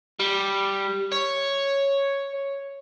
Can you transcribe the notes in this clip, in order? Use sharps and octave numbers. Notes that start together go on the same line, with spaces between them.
G3
C#5